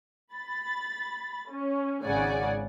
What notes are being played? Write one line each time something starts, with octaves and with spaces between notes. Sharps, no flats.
B5 A6
C#4
G#1 G#2 C#3 D5 F#5 G#5